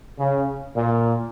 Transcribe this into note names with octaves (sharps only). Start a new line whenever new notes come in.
C#3
A#2